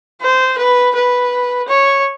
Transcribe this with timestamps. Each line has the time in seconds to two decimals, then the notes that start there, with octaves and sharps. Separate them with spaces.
0.21 C5
0.57 B4
0.95 B4
1.68 C#5